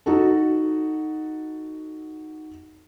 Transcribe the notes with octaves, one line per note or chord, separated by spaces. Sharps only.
D#4 F#4 A4